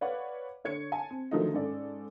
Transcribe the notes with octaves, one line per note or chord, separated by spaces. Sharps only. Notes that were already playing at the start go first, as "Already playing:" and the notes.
B4 C#5 D5 F5 F#5
D3 C#5 G#6 C#7
G#5 A5
C4
D3 D#3 F3 F#3 A3 D#4
G#2 C#4 A4 D5